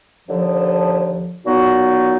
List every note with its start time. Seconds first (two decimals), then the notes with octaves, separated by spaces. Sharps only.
0.28 D#2 D3 F3
1.45 A#2 F#3 B3 D#4 F#4